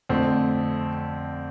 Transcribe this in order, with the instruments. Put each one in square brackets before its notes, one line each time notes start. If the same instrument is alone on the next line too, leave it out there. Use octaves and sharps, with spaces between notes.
[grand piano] F2 D3 A3 C4